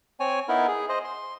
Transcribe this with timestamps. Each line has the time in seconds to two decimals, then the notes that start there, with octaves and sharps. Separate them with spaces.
0.20 C4 C#5 G#5
0.49 B3 D#4 E4 A#4
0.68 G#4
0.89 C5 D#5
1.04 C6